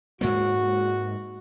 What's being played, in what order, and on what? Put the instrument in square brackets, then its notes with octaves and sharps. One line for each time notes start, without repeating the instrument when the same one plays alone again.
[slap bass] G#2 G#3 A#3 [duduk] F#4